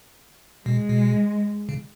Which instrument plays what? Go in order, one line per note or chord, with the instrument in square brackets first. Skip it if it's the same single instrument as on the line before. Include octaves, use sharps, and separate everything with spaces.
[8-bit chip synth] B2 [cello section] G#3
[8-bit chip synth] B2
C#3